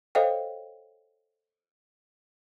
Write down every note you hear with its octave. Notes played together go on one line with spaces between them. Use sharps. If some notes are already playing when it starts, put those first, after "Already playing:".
A4 C5 C#5 D#5 F5 G5